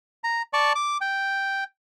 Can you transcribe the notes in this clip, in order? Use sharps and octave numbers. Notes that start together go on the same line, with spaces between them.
A#5
D5 A5 C#6
D6
G5